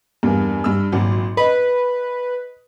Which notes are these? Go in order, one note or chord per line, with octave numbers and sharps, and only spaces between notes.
E2 G2 A#3
G2 E6
G#1 A#2 F#3
B4 D#5